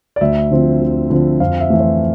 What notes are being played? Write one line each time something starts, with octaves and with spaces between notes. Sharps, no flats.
D5
D2 E5
D3 F3 C4
D2
D3 F3 C4
F2 F5
E5
E3 A3
C5